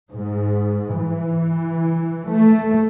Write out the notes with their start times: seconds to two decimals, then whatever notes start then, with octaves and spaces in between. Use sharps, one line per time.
0.12 G#2
0.98 E3
2.28 A3